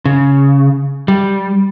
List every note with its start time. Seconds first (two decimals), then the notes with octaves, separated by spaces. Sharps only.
0.05 C#3
1.08 G3